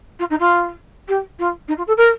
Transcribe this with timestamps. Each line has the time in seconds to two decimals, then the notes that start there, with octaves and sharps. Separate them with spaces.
0.19 F4
0.30 D#4
0.40 F4
1.08 G4
1.39 F4
1.68 D#4
1.78 F4
1.87 A4
1.97 A#4